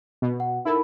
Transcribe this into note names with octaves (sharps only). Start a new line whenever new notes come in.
B2
F#5
D#4 E4 A4 A#4 B5